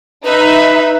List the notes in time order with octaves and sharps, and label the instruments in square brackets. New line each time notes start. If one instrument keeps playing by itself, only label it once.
[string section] D#4 E5 [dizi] B4